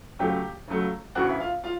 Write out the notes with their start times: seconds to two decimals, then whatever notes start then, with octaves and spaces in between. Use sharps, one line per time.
0.19 C#2 C#3 F#3 A3 G4 G5
0.68 C#2 C#3 F#3 A3
1.15 E1 D2 C#3 E3 F#4 F#5
1.29 E5
1.40 F4 F5
1.64 F4 F5